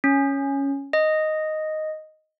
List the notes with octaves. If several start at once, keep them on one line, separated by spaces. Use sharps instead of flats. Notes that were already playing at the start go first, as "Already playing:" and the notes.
C#4
D#5